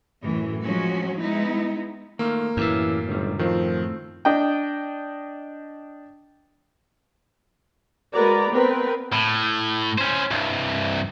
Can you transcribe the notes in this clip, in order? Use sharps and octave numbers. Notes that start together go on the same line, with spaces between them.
F#2 A2 E3
F3 F#3 G#3 C#4 F#4
G#3 B3 D#4 E4
D#3 A3 A#3 F4
F#2 A2 E3 C#4 G4 E5
G1 C#2 D#3 G3
D#3 F3 A3 C4
D4 D#5 G5
G#3 F#4 A#4 B4 D5 A#5
B3 C4 A#4 B4
A2
C#4 C5
C2 G2